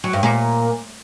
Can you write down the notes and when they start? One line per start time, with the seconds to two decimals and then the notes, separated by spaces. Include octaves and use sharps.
0.04 F#3
0.13 G2
0.23 A#2